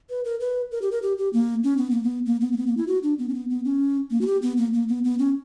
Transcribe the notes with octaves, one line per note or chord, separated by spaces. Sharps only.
B4
A#4
B4
A#4
G4
A#4
G4
G4
A#3
C#4
B3
A#3
B3
A#3
B3
A#3
B3
A#3
E4
F#4
D4
B3
C#4
B3
B3
C#4
A#3
F#4
G4
B3
A#3
A#3
B3
B3
C#4